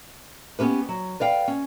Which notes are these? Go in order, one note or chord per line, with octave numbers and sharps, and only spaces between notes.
B3 C#4 G4 B4
F#3
B4 D5 F5 G5
C#4